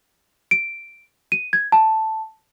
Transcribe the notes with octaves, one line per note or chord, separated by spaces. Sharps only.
D7
D#7
G#6
A5